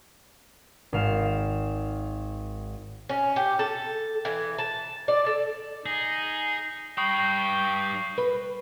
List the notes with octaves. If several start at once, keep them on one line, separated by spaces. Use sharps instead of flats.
G#1 F5 E7
C#4
G4
A4
E3
A5
D5
A4
D#4 G#4 A#6
G2 G5 B5 C#6 D#6 C7
B4